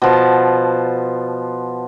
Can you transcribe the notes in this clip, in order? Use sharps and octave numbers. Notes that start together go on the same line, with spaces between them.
B2 F3 A5